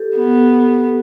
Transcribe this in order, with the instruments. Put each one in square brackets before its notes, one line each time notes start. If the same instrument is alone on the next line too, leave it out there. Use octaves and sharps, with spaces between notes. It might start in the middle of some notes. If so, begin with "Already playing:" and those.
Already playing: [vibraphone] G4 A4
[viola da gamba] B3